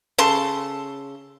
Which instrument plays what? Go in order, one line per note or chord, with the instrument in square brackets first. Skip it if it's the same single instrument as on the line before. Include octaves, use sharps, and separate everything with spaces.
[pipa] C#3 A4 C6